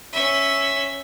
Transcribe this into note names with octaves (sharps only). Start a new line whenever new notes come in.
C#4 E5